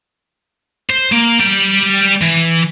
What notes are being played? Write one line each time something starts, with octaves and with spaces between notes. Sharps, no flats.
C5
A#3
G3 G5
E3